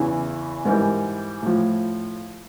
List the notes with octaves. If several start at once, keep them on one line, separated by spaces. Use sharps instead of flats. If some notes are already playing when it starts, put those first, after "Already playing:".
Already playing: E2 C#3 E3
G#2 E3 G3 A#4
A2 F3